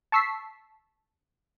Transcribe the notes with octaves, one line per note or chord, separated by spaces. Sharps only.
A5 C#6 E6 B6 C7